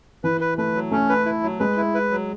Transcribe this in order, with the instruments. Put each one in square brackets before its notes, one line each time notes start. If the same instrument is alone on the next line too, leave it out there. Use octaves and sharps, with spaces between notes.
[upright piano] E3 [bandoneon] B4
[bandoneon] B4
[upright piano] A3 [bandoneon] B4
[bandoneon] F#3
[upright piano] A3 [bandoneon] C#4
[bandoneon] B4
E4
F#3
[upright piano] G#3 [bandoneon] B4
[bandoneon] E4
B4
F#3